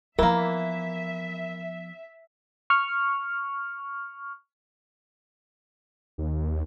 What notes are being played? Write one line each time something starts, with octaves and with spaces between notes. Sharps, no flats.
E3 F3 A#3 B3 A#4 E5
C#6 F6
D#2